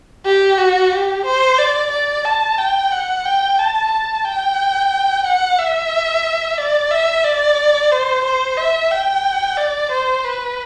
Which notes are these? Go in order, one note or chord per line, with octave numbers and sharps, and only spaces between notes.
G4
F#4
G4
C5
D5
D5
A5
G5
F#5
G5
A5
A5
G5
F#5
E5
D5
E5
D5
C5
C5
E5
G5
D5
C5
B4